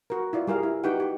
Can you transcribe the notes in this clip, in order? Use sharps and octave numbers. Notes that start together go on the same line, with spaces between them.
F#4 A#4
E4 F4 D5
G3 G#4 A#4 F5
E4
D#4 F#4 G4 B4 F#5 G5
G4